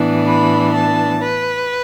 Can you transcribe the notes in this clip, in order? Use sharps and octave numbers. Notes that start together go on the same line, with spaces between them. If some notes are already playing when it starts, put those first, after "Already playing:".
Already playing: A2 E3 B3 D4
B5
A5
B4